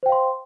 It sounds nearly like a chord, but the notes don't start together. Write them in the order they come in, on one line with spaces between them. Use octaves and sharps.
C5 G5 F5 C6